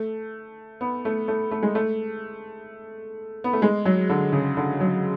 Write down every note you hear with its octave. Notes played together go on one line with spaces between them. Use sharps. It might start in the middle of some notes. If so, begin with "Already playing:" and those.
Already playing: A3
B3
A3
A3
A3
G#3
A3
B3
A3
G#3
F#3
D3
C#3
D3
F#3